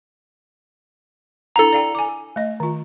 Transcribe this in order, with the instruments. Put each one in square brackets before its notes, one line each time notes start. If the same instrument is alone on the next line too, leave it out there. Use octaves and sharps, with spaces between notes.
[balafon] D4 E4 F#5 [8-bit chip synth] A4 A#5
[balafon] D5 F5 G5
G#5 D6
A3 D#5
D#3 F4